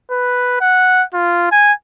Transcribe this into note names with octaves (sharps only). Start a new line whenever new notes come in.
B4
F#5
F4
G#5